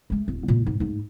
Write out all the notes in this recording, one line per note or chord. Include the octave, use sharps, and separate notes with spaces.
G#3 A3
D1
A#2
G#2
G#2 A3